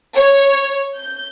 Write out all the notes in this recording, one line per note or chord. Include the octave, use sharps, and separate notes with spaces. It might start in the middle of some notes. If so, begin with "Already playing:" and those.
C#5
G6